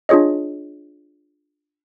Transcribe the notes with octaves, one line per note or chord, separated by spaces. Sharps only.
D4 F4 G#4 C#5 D#5